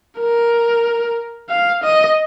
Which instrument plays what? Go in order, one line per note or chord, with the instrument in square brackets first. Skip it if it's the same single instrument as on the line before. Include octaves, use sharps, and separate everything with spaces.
[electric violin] A#4
F5
D#5